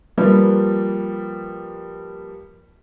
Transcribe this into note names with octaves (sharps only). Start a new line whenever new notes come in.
F3 G3 A#3 B4